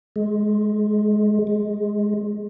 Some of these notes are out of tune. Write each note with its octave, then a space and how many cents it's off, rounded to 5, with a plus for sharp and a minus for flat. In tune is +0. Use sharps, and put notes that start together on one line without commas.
G#3 +15
G#3 +5